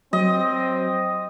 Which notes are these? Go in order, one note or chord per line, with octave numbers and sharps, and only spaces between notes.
F#3 C4 D#5